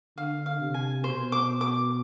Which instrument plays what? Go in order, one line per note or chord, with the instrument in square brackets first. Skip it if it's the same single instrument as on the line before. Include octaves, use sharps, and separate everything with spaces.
[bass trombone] D3 [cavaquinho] F5
[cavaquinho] F5
[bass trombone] C3
[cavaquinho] G#5
[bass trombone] B2 [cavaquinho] C5
[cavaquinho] D6
D6